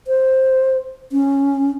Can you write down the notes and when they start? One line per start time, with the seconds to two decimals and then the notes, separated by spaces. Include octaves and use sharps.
0.07 C5
1.12 C#4